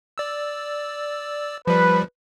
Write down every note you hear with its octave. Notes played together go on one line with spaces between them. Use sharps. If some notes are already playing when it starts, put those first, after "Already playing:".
D5 E6
F3 G3 B4